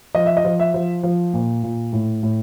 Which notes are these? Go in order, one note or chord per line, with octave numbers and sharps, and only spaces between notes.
F3 D#5
E5
D#5
F3
E5
F3
F3
A#2
A#2
A2
A2